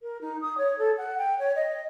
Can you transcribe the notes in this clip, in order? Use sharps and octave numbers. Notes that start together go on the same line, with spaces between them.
A#4
D#4
D#6
C#5
A4
F#5
G5
C#5
D#5